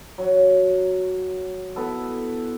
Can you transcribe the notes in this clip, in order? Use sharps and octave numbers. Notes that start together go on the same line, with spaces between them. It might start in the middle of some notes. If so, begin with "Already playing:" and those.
F#3
B3 E4 A4